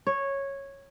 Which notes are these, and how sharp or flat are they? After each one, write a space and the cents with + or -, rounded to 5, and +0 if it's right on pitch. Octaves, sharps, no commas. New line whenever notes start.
C#5 -10